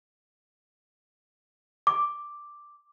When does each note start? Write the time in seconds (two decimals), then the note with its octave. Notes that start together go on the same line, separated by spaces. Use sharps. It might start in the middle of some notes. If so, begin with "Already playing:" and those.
1.87 D6